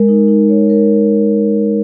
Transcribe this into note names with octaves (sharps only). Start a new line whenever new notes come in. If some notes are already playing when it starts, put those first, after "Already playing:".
Already playing: G#3 A#4
D#4
D#4
C#5
A#4